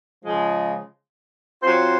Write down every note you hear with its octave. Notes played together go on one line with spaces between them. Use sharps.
C#3 F3 G#3
F#3 C4 F4 C5